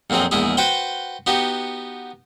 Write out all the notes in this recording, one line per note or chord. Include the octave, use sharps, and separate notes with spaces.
A#1 F2 F#3 C4 G#4
A#1 E2 G#3 E4 G#4
F#4 B4 C5 F#5 G5
B3 D#4 F#4 G4